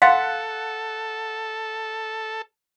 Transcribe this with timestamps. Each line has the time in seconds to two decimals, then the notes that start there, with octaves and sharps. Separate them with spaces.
0.02 A4 F5 F#5 C6 A6